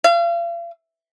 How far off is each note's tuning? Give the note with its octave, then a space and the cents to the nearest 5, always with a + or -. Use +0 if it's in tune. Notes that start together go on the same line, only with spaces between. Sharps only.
F5 -40